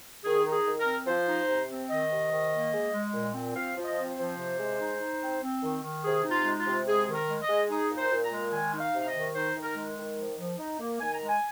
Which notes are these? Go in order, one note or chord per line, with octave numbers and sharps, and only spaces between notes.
D#3 G#4
D#4
G#4
D#3
A#4
C4
F3 C5
D#4
C3
C4
D#3 D#5
C3
D#3
A#3
G#3
G#3
A#2
C4
F3 F5
F3
D#5
C4
C5
F3
C3
G#3
D#4
D#4
C4
C4
D#3
D#3
C3 G#4
D#4
F4
G#3
F4
C3
G#3 G#4
D#3
A#4
G#3
D#5
G#3
D#4 G#4
A#2
C5
A#2
A#5
G#3
D#3 G#5
D#4
F5
C3
F5
D#5
D#3
D#4 C5
D#3
A#4
G#3
D#3
F3
F3
D#4
A#3
D#3 G#5
A#5
G#3
G#5